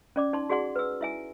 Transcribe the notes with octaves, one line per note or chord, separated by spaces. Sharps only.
C#4 D5 D6
D#4 A5 C6
F#4 G#4 D5 F#5 C6
B4 E6
E4 E5 G#5